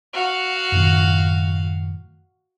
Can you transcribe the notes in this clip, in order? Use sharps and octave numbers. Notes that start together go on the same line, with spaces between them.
F#4 F5
F#2 A2 D#3